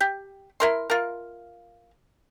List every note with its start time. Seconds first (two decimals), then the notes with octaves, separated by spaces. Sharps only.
0.01 G4
0.60 E4 A#4 C6
0.90 F4 A#4